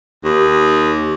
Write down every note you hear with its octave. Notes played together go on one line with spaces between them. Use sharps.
D#2